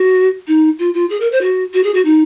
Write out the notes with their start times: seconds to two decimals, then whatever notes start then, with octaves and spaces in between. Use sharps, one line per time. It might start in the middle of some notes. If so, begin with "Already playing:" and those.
Already playing: F#4
0.47 D#4
0.78 F4
0.93 F4
1.09 G#4
1.20 A#4
1.31 C5
1.41 F#4
1.73 F#4
1.83 G#4
1.93 F#4
2.04 D#4